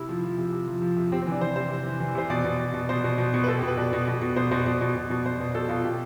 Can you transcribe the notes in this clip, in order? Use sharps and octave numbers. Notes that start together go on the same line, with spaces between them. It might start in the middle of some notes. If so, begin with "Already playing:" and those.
Already playing: C3 E4
F3
F3
C3
C3
F3
F3
C3
C3 C4
C4
E3
D4
E3 C5
C3 C5
C3
E3
E3
C3 C5
B2 D5
B2
B2
B2
B2 C5
B2
B2
B2
B4
B2 A4
G4
B2
B4
B2 D5
B2
B2
B2
B2 C5
B2 C5
B2 D5
B2
B2
B2
B2 C5
B2
B2 A4
B2 F4
B2 G4